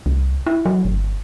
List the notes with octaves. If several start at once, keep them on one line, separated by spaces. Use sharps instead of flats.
C2
E4
F#3
G1